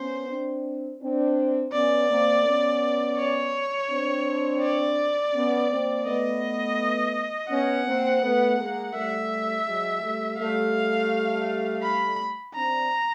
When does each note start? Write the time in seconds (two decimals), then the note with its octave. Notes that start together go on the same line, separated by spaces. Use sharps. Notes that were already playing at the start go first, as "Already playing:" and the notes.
Already playing: B3 C#4 C5
0.28 C4 D4
1.01 C4 D4
1.72 B3 C#4 D5
2.08 A#3 C4
2.45 B3 C#4
3.17 C#5
3.89 C4 D4
4.62 D5
5.33 B3 C#4
5.69 A#3 C4
6.06 A3 B3 D#5
7.50 B3 C#4 F#5
7.86 A#3 C4
8.22 A3 B3
8.58 G#3 A#3
8.94 G3 A3 E5
9.66 F#3 G#3
10.02 G3 A3
10.39 G3 A3 F5
11.83 B5
12.55 C4 D4 A#5